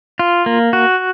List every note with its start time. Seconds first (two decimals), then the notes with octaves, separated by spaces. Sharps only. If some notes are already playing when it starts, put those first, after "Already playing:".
0.19 F4
0.46 A#3
0.73 F#4